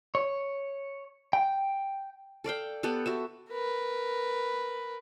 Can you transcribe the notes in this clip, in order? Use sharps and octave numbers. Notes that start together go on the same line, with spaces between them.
C#5
G5
A4 D5 F5 G5
B3 G4 A4 F#5
F#4 A4 E5
A#4 B4